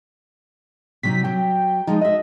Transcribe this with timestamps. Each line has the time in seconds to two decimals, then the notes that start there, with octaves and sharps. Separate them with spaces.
1.03 C3 F#3 D#4 B6
1.24 F#3 G4 G5
1.87 F3 G#3 D#4 F4
2.01 F#4 D#5 E5